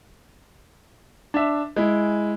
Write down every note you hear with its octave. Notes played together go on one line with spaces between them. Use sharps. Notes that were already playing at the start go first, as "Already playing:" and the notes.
D4 E5
G#3 E4